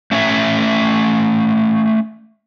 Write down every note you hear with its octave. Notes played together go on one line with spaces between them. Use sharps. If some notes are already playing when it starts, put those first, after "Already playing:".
A3 C#4 C#5 E5